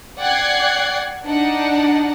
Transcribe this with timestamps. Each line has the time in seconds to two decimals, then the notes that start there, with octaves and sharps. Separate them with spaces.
0.19 D5 F#5 G5 F#6 G#6 C7
1.25 D4 D#4 D5 F#5